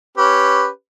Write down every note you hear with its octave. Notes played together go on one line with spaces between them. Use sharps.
C#4 G4 B4